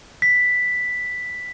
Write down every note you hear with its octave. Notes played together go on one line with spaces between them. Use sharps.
B6